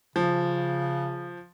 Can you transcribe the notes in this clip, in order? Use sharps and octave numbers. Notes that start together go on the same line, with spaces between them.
C#3 F3